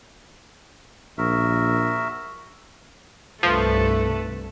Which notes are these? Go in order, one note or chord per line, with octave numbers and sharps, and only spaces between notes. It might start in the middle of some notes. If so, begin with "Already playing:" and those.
A#1 F#4 A#4 E5
C2 G2 F3 A3 A4 B4